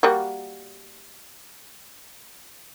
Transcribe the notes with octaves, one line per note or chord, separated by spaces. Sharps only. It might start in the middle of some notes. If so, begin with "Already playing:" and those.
G3 A#3 F#4